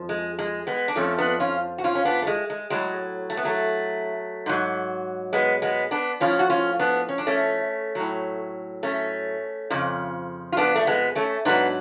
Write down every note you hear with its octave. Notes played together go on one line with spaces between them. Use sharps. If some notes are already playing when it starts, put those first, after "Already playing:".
Already playing: F2 F3
G#3
G#3
G#3 B3
D4
F2 F3 A3 C#4
B3 D4
C#4 F4
F#4
C#4 F4
C#4
B3 D4
A3
G#3
G#3
A2 F#3 G#3
A3
B3
F#3 A3
G#2 F#3
G#3 B3
G#3 B3
B3 D4
A2 F3 C#4 F4
F#4
C#4 F4
B3 D4
C#4
D4
A3 C#4
A2 F#3
A3 C#4
F2 C#3 F3
F4
B3 D4
A3
G#3 B3
A3 C#4
G#2 F#3 B3 D4